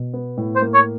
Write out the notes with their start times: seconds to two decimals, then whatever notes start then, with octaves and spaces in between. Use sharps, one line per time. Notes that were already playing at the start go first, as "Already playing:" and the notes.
Already playing: B2
0.13 B3
0.37 A2
0.56 C5
0.62 A#3
0.74 C#5